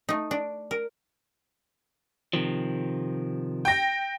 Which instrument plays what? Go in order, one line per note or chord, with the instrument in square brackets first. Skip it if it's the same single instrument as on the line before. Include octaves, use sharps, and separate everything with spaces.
[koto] A3 D#4
D4
A#4
[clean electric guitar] C3 D#3 F3
[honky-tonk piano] G5 A#6